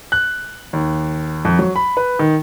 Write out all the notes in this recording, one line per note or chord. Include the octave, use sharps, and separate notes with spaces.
F#6
D#2
F2
F#3
B5
B4
D#3